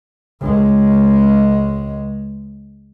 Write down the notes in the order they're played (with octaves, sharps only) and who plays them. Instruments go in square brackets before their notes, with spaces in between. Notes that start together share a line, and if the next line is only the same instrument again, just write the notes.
[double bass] C#2 G#3